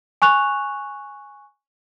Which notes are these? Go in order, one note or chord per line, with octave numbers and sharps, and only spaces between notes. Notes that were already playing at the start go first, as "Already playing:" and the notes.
G#5 C#6 F#6 F7